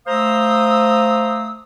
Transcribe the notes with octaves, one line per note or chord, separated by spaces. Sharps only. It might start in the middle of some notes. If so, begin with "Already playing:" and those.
A3 C5 F5 A#5 D#6 E6